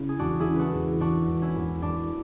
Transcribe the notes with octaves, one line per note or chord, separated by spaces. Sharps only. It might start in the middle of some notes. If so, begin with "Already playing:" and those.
Already playing: C#3 E4
G#4
E1 D4 F#4
E4 G#4
C#3
F#4 A4 B4
E1
E1 D4 F#4
E1
C#4 E4
E2
E1 D4